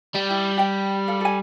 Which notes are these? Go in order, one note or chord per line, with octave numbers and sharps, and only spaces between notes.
G3 G5
E4
G4 G5
A4 F5
A4 G#5